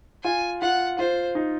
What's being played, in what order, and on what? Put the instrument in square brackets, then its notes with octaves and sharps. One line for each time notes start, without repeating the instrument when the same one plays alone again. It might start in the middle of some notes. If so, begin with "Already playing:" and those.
[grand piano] F4 [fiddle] G#5
[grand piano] F4 [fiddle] F#5
[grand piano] F4 [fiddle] C5
[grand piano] D#4